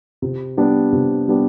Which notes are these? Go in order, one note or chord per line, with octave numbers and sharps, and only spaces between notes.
C3
G3 B3 D4 G4
C3
G3 B3 D4 G4